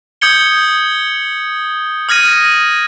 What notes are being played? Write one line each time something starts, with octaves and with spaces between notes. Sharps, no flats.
D#6 G6 G#6 C#7 G7
D#6 F6 G#6 A#6 D#7